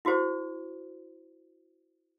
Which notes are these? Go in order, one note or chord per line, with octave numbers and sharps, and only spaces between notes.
E4 F#4 G4 C5